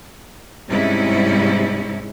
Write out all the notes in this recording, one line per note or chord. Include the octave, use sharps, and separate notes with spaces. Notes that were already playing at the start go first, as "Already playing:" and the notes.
G#2 C3 G3 G#3 C#4 E4